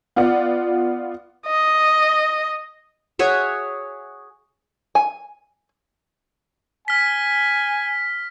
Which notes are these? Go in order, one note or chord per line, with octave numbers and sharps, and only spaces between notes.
B3 F4 D5 F#5
D#5
F#4 G#4 C#5 E5
G#5
G#5 F6 B6